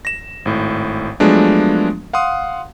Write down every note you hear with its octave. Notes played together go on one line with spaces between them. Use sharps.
A#6 E7
G#1 A2
F3 F#3 G#3 A3 B3 D4
F5 F#5 C6 D#6